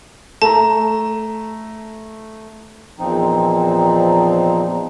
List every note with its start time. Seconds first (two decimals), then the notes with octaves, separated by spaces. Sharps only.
0.42 A3 A5 A#5
2.99 E2 A#2 F3 C4 D#4